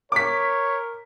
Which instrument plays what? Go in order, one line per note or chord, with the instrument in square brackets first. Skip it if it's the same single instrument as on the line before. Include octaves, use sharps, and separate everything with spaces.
[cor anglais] A#4 [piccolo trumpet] C#5 [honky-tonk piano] D6 B6